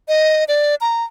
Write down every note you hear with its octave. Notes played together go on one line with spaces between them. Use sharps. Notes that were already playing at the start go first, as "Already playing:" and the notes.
D#5
D5
A#5